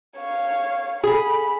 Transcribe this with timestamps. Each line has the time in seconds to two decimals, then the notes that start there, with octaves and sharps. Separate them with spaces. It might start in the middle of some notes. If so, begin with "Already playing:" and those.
0.17 C#5 F5
1.04 G#4 B5